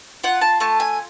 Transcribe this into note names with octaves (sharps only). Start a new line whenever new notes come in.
F4 F#5
A5
A3 A5
G#5